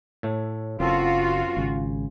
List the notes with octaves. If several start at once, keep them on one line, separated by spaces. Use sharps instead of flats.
A2 A3
F#1 F#2 C4 F4 F#4 A4
G#1 C#3